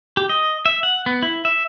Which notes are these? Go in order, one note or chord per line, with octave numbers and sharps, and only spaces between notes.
G4
D#5
E5
F#5
B3
E4
E5